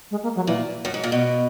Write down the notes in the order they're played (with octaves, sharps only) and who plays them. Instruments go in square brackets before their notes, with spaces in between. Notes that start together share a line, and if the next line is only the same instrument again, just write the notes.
[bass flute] G#3
A#3
F#3
[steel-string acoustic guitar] A#2 [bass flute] E3
[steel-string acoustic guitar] F#2
G#2
A#2
B2